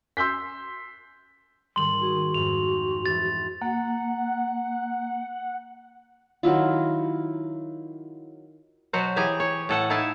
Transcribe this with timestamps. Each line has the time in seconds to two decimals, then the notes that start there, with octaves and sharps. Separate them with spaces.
0.17 C6 E6 G6 B6
1.76 G#2 D#3 G3 C6 F#7
2.01 C#4 F#4 G#4
2.34 F2 G#2 F7
3.06 F2 E3 A6
3.61 A#3 F#5
6.43 D#3 F#3 E4 F4
8.93 B2 F#3 F#4 C5
9.16 E3 G4 G#4 G#5 A#5
9.40 C#5
9.69 A2 A4 F#5 A5
9.90 D#4 E4 A4 F5 G#5 A5